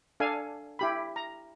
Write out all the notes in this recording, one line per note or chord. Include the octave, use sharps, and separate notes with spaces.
D4 A4 F5 G#5
E4 G4 B5
A#5